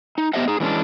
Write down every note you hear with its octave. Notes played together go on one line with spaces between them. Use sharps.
D#4
B3 G4 C5 D#5 E5 F#5
D#4 G#4
E3 G#3 C#4 D4